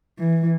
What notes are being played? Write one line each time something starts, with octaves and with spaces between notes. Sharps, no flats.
E3